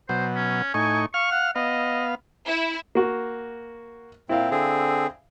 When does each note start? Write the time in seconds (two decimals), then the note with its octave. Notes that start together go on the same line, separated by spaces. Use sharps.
0.09 B2 F#3 C5
0.37 C#4
0.74 A2 D#4 G#5 C#6
1.14 F5 C#6 F6
1.32 F#5
1.56 B3 D#5 F5
2.45 E4
2.95 A#3 F#4
4.29 A#2 C4 E4 F5
4.51 D3 C4 G#4